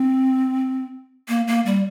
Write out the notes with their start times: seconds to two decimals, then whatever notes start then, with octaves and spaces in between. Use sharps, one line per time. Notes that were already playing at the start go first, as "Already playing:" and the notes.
Already playing: C4
1.28 A#3
1.47 A#3
1.66 G3